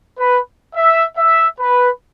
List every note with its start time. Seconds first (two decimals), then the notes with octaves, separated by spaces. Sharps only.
0.19 B4
0.75 E5
1.17 E5
1.59 B4